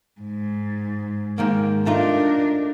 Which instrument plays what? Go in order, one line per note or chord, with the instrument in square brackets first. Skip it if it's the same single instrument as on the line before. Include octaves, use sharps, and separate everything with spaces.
[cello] G#2
[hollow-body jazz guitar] G#2 D#3 A#3
[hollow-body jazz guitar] A3 D#4 F4 [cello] D4 A#4